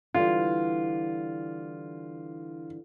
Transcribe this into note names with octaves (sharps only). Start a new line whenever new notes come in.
D3 E3 G3 F4